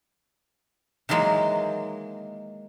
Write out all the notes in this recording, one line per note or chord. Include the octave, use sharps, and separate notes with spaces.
D#3 E3 F#3 G#3 A#3